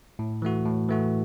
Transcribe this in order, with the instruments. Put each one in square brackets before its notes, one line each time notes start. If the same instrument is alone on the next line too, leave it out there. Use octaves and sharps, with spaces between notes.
[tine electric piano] A2
E3 A3 F#4
A2
E3 A3 F#4